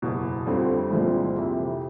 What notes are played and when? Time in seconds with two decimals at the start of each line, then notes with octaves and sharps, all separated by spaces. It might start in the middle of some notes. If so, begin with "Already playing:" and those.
0.02 F#1 E2 B2
0.46 G1 F2 D3 G3 C4
0.90 C2 A#2 F3 G#3 C4
1.35 F2 C3 E3